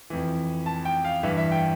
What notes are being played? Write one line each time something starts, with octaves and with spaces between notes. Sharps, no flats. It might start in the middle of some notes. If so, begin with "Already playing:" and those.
F2 E3
A5
G5
F5
G2 E3 E5
E5
G5